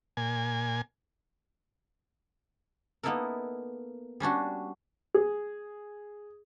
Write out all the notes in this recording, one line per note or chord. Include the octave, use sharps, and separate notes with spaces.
A#2 G#5
A#3 B3 D#4 E4 A4 A#4
G3 C#4 D4 F#4
G#4